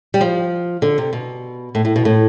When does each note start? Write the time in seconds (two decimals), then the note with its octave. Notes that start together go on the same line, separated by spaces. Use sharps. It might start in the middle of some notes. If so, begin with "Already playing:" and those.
0.14 G3
0.21 F3
0.82 D3
0.98 C3
1.13 B2
1.75 A2
1.85 A2
1.96 B2
2.05 A2